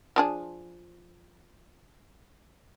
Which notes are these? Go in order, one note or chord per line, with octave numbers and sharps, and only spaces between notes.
F3 D4 G#4